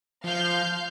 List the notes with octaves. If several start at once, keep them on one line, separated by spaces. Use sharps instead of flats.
F3 F5 F6 G6